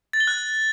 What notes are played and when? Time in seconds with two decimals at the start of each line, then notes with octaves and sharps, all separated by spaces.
0.13 A6
0.20 G7
0.27 F#6